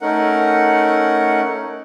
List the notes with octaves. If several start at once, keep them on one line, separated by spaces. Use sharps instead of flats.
A3 C#4 D#4 A#4 F#5